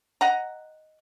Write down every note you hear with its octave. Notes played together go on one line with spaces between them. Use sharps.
D#5 F#5 A#5